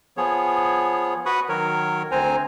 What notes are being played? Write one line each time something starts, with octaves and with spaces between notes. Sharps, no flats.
F3 B3 G#4 C#5
F#4 B4 B5 C#6 D#6
D#3 F#3 A#4 C#5
D2 C4 C5 G#5 A#5